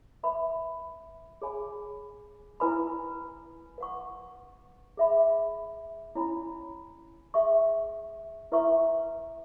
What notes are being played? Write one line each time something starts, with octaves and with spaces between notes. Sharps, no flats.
B4 E5 B5
G#4 C#5 G#5 B5
E4 B4 G#5 B5
B4 F#5 C#6
G#4 E5 B5
C#4 E4 C#5 G#5 B5
G#4 E5 C#6
E4 B4 E5 C#6